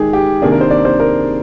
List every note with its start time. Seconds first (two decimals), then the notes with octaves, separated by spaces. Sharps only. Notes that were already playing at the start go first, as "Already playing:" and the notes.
Already playing: D#3 G#3 D#4 G4 G#4
0.13 G4
0.42 C3 D#3 A#3 D4 G#4
0.52 A#4
0.61 C5
0.70 D5
0.85 C5
1.00 A#4